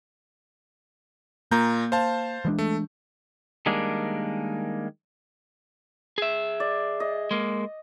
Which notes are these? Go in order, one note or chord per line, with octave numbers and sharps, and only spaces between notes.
A#2 A#3 A#5 G6
C5 F5 A5
E3 G#3 D4
A3
D#3 G3 G#3 A#3 D4
G#4 E5
D5
D#5
G#3 A#3